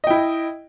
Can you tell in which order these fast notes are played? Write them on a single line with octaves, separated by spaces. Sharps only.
D#5 G5 E4